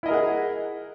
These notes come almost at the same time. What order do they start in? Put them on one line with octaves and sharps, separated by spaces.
E4 D#5 A#4 G#4 F#5